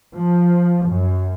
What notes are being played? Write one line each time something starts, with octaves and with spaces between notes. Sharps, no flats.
F3
F#2